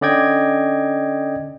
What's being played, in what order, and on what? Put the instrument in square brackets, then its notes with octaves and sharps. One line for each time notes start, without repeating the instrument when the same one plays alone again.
[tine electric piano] D3 C#4 D5 D#5 G5 G#6